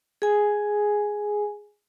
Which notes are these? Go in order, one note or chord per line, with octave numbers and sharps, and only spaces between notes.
G#4 G#5